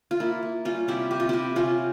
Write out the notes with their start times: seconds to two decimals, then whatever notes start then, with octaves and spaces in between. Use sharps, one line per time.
0.11 F4
0.20 A#3 E4
0.43 A#3
0.65 G3 C#4 F4
0.88 C3 E4 G4
1.11 C3 G4
1.20 F4
1.29 C3 E4 G4
1.56 C3 C#4 F4